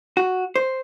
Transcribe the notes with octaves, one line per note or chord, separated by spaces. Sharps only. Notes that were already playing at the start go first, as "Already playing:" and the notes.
F#4
C5